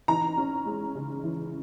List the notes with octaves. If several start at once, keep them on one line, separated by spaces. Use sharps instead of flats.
E3 A#5
C#4
G#3
C#3
E3